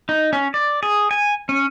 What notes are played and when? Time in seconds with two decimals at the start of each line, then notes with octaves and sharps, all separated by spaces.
0.09 D#4
0.33 C#4
0.54 D5
0.83 G#4
1.11 G#5
1.49 C#4